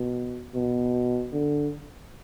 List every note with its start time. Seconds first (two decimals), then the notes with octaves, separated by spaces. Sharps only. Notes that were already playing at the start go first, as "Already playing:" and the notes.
Already playing: B2
0.55 B2
1.33 D3